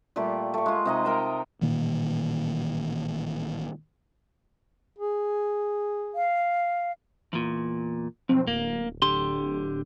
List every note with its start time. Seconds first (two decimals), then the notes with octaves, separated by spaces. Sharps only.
0.16 A#2 G3 A3 G4
0.54 A3 C#6
0.66 G#3 F4
0.85 C3 D#4 D#5
1.05 A#4 G5 A5
1.61 A1 A#2 D#3 A#3
4.99 G#4
6.14 F5
7.33 E2 A#2
8.29 B1 F2 C4
8.47 D1 A#3
9.02 D3 G4 C6